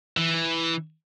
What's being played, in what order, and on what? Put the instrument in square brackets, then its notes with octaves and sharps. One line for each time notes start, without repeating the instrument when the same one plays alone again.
[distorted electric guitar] E3